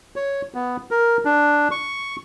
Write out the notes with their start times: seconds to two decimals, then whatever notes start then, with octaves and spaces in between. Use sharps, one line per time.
0.16 C#5
0.54 B3
0.91 A#4
1.25 D4
1.71 C#6